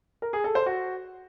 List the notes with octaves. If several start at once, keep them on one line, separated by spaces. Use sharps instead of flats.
A#4
G#4
A4
C5
F#4